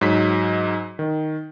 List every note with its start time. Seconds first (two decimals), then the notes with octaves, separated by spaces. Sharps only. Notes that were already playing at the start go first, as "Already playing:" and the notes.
0.01 G#2 F#3 B6
0.99 D#3